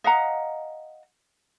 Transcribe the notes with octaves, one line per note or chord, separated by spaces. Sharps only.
D#5 F5 F#5 A#5